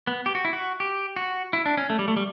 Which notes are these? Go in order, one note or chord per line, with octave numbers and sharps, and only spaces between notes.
B3
G4
F#4
E4
F#4
G4
F#4
E4
D4
C#4
A3
G3
A3
G3